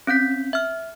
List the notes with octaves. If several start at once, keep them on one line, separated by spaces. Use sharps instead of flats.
C4 C#4 G6 B6
E5 F6